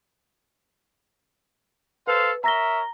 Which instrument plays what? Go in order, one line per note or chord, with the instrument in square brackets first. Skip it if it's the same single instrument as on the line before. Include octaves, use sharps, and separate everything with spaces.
[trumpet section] A4 C5 F5 [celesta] B4
[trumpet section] A#4 C#5 E5 [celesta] A#5 A#6 G7